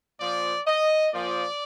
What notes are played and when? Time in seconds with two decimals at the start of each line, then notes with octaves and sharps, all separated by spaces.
0.20 A#2 F3 D5
0.67 D#5
1.13 A#2 F3 D5